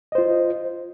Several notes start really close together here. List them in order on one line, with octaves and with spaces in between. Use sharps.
D#5 C5 F4